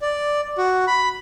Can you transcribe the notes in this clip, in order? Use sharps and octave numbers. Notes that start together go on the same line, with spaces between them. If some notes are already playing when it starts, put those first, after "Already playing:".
D5
F#4
B5